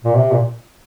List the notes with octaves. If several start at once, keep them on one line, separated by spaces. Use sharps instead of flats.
A#2
C3
A#2